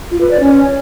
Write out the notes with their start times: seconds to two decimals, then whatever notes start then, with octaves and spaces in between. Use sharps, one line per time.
0.11 F4
0.21 B4
0.30 D5
0.40 C#4